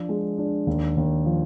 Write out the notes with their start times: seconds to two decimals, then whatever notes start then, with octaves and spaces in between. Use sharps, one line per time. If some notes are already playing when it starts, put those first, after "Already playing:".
Already playing: F3 D4
0.09 G#3
0.38 D4
0.67 D#2
0.97 D#2
1.25 F3